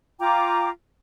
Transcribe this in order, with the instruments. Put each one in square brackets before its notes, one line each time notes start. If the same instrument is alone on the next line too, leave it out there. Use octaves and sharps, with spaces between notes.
[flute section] F4 G5 A#5 D6